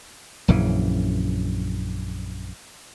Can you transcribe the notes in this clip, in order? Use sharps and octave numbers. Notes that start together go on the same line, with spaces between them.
A#1 F#2 C#3 E3